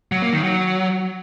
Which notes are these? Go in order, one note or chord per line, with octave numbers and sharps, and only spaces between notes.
F#3
A#3
D#3
F#3